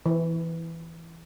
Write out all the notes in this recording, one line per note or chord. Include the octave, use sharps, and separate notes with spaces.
E3